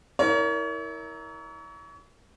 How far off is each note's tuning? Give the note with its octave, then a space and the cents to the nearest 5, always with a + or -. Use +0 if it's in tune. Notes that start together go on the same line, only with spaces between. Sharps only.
E4 -25 A#4 +0 C#5 +35